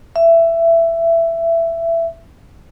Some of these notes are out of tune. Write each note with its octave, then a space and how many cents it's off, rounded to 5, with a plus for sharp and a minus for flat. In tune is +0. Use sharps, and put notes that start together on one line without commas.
E5 +15